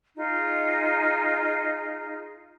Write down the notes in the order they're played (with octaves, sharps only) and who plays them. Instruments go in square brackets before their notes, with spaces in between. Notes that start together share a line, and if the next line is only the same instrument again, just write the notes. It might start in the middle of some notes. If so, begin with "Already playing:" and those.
[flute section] D#4 F4 G#4